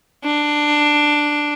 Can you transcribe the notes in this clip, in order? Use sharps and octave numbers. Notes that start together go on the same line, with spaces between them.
D4